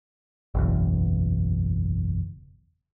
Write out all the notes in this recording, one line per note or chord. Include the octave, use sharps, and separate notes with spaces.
F#1 B1 E2